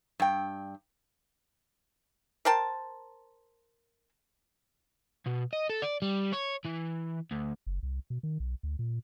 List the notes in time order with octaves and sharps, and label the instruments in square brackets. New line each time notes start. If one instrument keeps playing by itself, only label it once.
[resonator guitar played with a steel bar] G2 G5
[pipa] A#4 C5 G5 A5
[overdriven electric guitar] B2
D#5
A4
D5
G3
C#5
E3
D2
[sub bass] F#1
C2
B2
D#3
B1
D2
A#2